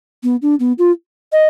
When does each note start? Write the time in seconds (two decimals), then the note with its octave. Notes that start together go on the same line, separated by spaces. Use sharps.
0.23 B3
0.42 D4
0.60 B3
0.78 F4
1.32 D#5